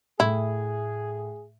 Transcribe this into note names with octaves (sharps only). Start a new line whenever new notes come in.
A2 E4 G#4